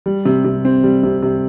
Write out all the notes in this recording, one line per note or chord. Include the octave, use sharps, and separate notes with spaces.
G3
C3
C3
C4
G3
C3
C3